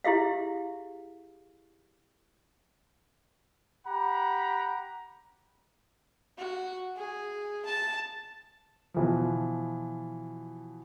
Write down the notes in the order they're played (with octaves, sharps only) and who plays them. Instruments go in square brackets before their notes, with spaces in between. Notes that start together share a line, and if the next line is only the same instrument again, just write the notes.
[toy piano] E4 G4 G#4 E5 F5
[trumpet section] G4 F#5 A#5 B5
[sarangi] F#4
G#4
A5
[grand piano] B2 E3 F3